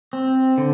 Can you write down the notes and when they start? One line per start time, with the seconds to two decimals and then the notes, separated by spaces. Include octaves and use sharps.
0.13 C4
0.58 D3